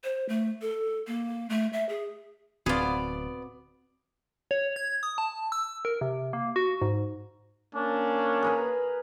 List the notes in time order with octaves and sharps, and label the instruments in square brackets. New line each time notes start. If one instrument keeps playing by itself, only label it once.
[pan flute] C5
A3
A4
A#3
A3
E5
G#4
[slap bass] D1 [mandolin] B3 D5 [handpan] C4 F#4 [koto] F4 G#4
[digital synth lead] C#5
G#6
D#6
A5
E6
A#4
C3
A#3
F#4
G#2
[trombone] A#3 [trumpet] C#4 [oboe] D4
[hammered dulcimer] G#4 A#4 B4